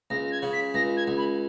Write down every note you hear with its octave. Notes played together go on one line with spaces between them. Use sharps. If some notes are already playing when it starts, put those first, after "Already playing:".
C#2 A#6
A#6
G#6
C#3
B6
C#2 A#6
G#6
C#2
B5